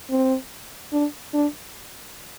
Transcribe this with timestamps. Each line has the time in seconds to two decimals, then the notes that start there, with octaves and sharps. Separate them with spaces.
0.10 C4
0.93 D4
1.34 D4